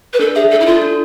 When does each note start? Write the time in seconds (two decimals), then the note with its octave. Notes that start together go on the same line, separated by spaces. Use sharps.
0.13 B4
0.19 D4 A4
0.35 G#4 E5
0.50 D4 A4
0.61 E4
0.66 F4 A4
0.82 D4